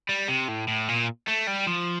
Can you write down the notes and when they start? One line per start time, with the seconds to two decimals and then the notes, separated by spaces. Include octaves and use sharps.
0.09 G3
0.28 C3
0.48 A2
0.68 A2
0.88 A#2
1.28 A3
1.48 G3
1.67 F3